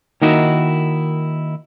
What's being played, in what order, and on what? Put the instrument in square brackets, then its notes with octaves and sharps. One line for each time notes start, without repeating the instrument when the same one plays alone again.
[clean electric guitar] D#3 A#3 D#4 E4 F#4 D#5